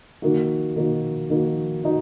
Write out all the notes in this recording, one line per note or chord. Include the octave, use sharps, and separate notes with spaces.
D#3 A#3 D#4 F#4
D#3 A#3 D#4 F#4
D#3 A#3 D#4 F#4
D#4 F#4